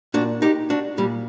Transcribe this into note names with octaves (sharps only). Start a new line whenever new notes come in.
A#2 D4 F#4
D#4 G4
D4 F#4
A#2 G3